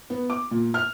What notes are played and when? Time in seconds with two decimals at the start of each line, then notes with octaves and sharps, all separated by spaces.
0.10 B3
0.30 D6
0.51 A#2
0.74 F6